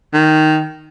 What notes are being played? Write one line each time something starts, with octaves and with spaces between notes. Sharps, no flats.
D#3